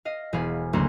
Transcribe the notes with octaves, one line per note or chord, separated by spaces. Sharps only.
D#5 F5
E1 G#4 F5 B5
F#1 D2 A3 A#3 A#5 C6